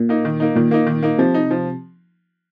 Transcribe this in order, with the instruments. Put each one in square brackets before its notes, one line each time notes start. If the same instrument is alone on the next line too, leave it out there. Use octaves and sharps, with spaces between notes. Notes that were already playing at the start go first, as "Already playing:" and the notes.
Already playing: [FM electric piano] A#2
[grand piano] A#3 D#4
D#3
A#3 D#4
[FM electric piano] A#2 [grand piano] D#3
[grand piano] A#3 D#4
D#3
A#3 D#4
[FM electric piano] C3 [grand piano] F3
[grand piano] D#4
F3